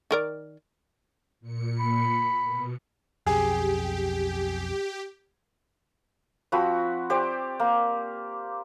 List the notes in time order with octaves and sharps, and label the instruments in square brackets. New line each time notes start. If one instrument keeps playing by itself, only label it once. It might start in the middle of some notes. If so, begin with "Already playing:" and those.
[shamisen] D#3 A#4 D5
[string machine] A#2 C#7
[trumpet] B5
[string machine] B2
[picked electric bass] B1 F2 [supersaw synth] G4 [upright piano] G#4
[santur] F3 C4 F#4 B5
G4 C5 D5
A#3